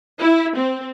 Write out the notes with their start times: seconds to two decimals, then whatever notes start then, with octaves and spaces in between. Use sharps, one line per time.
0.20 E4
0.56 C4